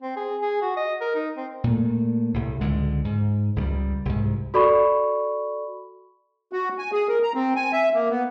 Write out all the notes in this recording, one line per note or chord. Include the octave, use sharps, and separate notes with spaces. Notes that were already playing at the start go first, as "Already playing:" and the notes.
C4
G#4
G#4
F#4
D#5
A#4
D#4
C4
A#2 A3
C2 A2
C#2 D3 G#3
G#2
C#2 F3 G3
C2 G#2
F#4 A4 D5 B5 C#6
F#4
G#5
G#4
A#4
A#5
C4
G#5
E5
A#3
B3